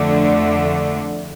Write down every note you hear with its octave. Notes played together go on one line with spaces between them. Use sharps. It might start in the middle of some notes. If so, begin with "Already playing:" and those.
Already playing: F2 D3 A3 D4